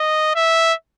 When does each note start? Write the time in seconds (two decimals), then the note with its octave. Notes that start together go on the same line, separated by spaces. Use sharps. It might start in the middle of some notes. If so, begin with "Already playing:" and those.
Already playing: D#5
0.36 E5